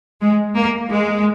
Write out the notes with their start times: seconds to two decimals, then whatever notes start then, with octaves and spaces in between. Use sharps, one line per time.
0.21 G#3
0.56 A#3
0.91 G#3